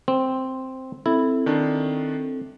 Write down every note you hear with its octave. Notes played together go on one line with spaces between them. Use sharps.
C4
C4 E4 A4
D#3 D4